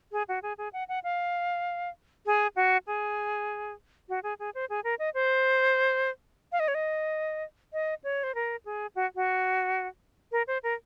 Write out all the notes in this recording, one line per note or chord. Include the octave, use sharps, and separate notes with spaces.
G#4
F#4
G#4
G#4
F#5
F#5
F5
G#4
F#4
G#4
F#4
G#4
G#4
C5
G#4
A#4
D#5
C5
F5
D#5
C#5
D#5
D#5
C#5
C5
A#4
G#4
F#4
F#4
A#4
C5
A#4